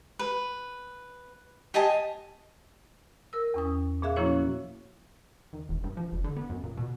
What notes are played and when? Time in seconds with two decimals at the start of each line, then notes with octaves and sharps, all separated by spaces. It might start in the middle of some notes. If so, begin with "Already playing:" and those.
0.19 B4
1.74 G4 D#5 G#5 A5
3.33 A#4 E6
3.54 E2 C#4 D#6
4.02 A#2 B3 G#4 E5 F5 F#6
4.16 F3 A#3 C#4 E4 F#4 C#5
5.53 D#2
5.69 E1
5.84 G2
5.97 F3
6.12 F#1
6.24 D3
6.37 B3
6.49 F#2
6.64 A#2
6.77 B2